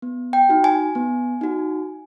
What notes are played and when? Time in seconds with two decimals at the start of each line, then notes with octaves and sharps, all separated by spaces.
0.02 B3
0.33 G5
0.49 D#4 F#4
0.64 G#5
0.95 B3
1.41 D#4 F#4